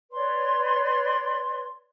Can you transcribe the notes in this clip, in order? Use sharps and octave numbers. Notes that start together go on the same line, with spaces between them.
B4 C#5 D5 C6